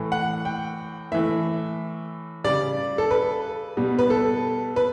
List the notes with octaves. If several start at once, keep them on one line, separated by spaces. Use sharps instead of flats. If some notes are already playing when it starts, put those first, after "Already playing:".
Already playing: A2 E3 A3
F#5
G5
A2 E3 A3 E5
C#3 G3 D5
A4
B4
B2 G3
B4
A4
B4